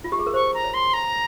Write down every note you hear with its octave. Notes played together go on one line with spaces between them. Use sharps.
F4
G4
G#4
A#4
C5 C#6
A#5
C#5
C6
A#5